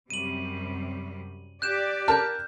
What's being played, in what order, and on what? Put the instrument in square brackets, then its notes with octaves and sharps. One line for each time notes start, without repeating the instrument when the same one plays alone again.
[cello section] F#2 C3 G3 [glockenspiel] D#7 F#7
[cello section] G4 D5 [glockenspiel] F#6 G6 E7
[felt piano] A#4 A5 [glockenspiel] F6 G6